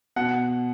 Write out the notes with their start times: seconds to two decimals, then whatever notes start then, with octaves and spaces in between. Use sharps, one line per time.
0.16 B2 F#5